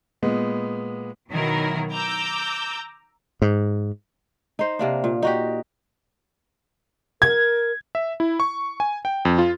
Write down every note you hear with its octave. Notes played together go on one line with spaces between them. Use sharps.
A#2 G#3 B3
B2 D#3 F#3 E4 A#4
A#5 D6 E6 G6
G#2
D#4 C5
C3 A#3 D4
A#2
D#4 F#4 G4
A#4 G#6
E5
E4
C#6
G#5
G5
F2
F4